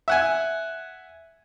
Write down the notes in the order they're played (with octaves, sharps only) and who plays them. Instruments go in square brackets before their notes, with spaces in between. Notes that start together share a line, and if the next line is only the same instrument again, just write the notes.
[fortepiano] E5 F#5 G#5